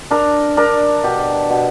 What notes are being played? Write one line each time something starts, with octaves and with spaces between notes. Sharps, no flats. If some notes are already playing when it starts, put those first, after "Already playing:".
D4 A#4
D4 A#4
B2 G4
B2